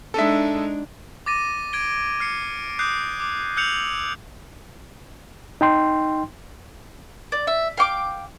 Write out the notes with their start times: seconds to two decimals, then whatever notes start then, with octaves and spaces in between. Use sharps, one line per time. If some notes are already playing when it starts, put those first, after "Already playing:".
0.14 G#3 D4 D#4 A4 E5
1.26 D6 A6 A#6 D#7
1.73 G#6 D7 G7
2.20 F6 C7 C#7
2.79 D6 D#6 F#6 G6 C7
3.20 D6
3.56 E6 F#6 G6 C#7 F7 F#7
5.61 D#4 G5 C6
7.32 D5
7.47 E5
7.78 F5 G5 C#6 D6